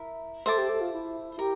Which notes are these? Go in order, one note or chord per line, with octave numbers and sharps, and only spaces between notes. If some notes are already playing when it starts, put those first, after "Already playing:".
Already playing: E4 A#4 E5
A4 C5 E5 A5 D6
G4
A4
F4
E4
G4 A#4